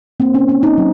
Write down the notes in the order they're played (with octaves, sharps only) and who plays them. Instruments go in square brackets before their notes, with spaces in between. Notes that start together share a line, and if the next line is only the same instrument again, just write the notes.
[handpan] A#3 C4
C#4
A#3 C#4
D#4
F#3